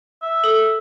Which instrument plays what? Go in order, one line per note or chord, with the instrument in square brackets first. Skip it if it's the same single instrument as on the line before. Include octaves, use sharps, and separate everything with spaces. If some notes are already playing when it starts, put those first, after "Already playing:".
[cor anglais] E5
[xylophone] A4 D#6